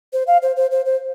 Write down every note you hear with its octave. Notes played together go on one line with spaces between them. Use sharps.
C5
F5
C5
C5
C5
C5